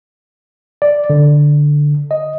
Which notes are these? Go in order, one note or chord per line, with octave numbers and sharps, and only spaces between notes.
D5
D3
D#5